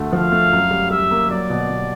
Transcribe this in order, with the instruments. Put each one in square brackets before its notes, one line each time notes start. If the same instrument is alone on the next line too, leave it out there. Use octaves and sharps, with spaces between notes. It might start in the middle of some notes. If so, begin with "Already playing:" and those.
Already playing: [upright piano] D2 A3
[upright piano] F3 [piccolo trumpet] F5
[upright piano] A3
F#2
G3
[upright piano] G3 [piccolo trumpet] E5
[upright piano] A#3
[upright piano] F#3 [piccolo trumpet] D5
[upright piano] B2
B2